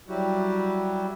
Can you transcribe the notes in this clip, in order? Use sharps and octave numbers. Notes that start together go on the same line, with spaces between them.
F#3 G3 E4 F#4 G4